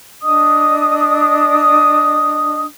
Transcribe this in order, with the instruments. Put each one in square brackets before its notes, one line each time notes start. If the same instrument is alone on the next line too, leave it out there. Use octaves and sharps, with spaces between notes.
[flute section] D4 D#5 D#6